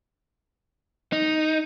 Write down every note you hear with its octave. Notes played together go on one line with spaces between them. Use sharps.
D#4